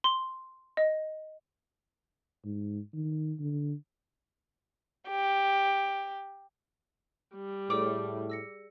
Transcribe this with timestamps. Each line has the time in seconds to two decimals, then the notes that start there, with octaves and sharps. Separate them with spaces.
0.04 C6
0.77 D#5
2.45 G#2
2.93 D#3
3.39 D3
5.08 G4
7.35 G3
7.70 A2 G#4 D5 D6
8.30 E6 A#6 C#7